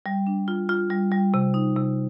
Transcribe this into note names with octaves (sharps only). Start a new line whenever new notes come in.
G3
D4
F4
F4
G3
G3
C3
D#4
C3